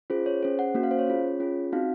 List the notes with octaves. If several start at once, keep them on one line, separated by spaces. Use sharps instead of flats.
C#4 F4 G#4 C5
C#5
C#4 G#4 C5
F#5
A#3 C#4 F#4
F5
C5
C#5
C#4 F4 G#4
C#4 F4 G#4
C4 D#4 F#4 F5